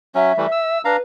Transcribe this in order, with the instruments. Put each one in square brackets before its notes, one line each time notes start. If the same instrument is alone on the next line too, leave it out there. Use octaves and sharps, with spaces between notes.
[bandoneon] F#3 C#4 [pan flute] E5
[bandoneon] E3 G3 A3
E6
[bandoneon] D4 F5 A#5 [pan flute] B4